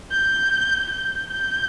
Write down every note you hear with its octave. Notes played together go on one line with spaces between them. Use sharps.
G6
G6
G6